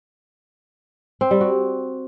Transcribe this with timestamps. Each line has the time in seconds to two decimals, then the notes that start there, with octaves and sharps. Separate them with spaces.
1.21 C4
1.31 G3
1.41 F#4